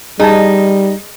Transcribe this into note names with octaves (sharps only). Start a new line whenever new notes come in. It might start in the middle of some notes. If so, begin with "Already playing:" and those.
G3 D#4 G#4 G#5 A5